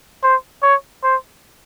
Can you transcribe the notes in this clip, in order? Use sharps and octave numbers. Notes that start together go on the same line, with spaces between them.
C5
C#5
C5